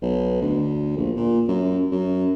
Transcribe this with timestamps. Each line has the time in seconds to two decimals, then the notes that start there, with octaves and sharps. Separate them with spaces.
0.02 B1
0.41 D2
0.96 A#1
1.17 A#2
1.48 F#2
1.92 F#2